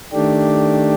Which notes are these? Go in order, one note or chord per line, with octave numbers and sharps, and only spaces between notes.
D#3 A3 D4 G4